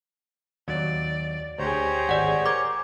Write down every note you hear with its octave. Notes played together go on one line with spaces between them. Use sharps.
D#2 F#3 D5
D2 G4 G#4 C5 C#5 A#5
G#1 D5 E5 F#5
A#4 D6 G#6